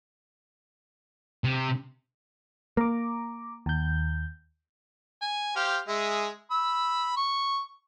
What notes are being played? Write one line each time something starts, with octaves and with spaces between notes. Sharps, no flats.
C3
A#3 A#5 D6
D#2 G6
G#5
G4 C5 F5
G#3 G#4 E5
B5 E6
C#6